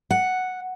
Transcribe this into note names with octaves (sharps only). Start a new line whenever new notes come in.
F#5